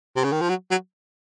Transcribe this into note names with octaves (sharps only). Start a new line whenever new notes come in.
C3
C#3
D#3
F3
F#3
F#3